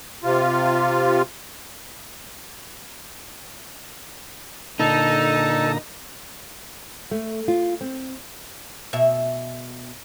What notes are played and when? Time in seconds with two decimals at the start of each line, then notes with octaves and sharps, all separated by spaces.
0.24 C3 F4
4.80 A#2 D3 D#4 A4 A5 A#5
7.11 A3
7.48 F4
7.81 C4
8.93 B2 E5